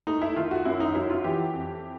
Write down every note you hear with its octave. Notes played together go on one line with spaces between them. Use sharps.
A3 D#4
E4
D#3 F4
F#4
F#2 E4
D#4
F#3 E4
F4
E3 G4
F2